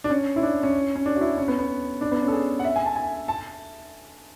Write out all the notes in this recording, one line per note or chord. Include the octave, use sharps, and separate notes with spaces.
D4
C#4
E4
D4
C#4
C#4
D4
F#4
E4
C#4
B3
B3
D4
B3
C#4
A4
G#4
F#5
E5
G#5
A5
G#5
A5